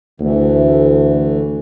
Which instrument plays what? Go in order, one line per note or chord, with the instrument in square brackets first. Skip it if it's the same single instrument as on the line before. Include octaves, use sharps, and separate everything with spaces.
[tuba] D2 [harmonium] E3 A3